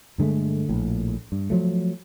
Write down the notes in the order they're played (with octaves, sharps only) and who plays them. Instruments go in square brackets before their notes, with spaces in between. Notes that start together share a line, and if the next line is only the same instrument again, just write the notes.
[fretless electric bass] G2 D3 G#3 A3
A#1 A2
G2
F3 F#3 A3